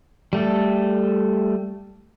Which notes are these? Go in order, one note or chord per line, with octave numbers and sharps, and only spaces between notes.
G3 A3 A4